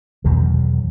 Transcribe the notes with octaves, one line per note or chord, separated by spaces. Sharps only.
E2 B2 D#3 F#3